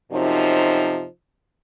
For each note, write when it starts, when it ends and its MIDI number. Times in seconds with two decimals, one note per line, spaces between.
0.12 1.05 42
0.12 1.05 48
0.12 1.05 53
0.12 1.05 63